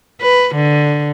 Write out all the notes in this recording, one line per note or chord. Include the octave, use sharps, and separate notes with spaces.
B4
D3